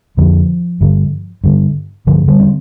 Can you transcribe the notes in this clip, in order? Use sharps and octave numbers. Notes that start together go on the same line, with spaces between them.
F2 D3 F3
G2 D3
G2 D3
G2 D3 F3
D3 G3
C4